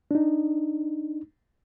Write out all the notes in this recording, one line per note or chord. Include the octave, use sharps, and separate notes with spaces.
D4 D#4